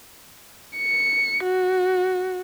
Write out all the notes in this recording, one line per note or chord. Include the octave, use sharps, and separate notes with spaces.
C#7
F#4